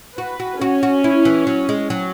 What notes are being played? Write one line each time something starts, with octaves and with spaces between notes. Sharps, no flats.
F#4 B4
F#4
C#4 F#4
F#4
E4
E3
F#3
G#3
F#3